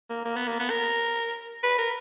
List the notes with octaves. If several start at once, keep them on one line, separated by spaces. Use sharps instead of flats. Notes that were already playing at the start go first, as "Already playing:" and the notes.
A#3
A#3
B3
A#3
B3
A#4
B4
A#4